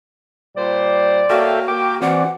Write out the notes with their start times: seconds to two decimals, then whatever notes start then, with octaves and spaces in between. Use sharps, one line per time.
0.56 A#2 G3 C5 D5
1.30 A#3 F#4 A4 C#5 E5 F5 G5
1.68 A#3 G5 D6
2.02 E3 C4 F#4 D5 F#5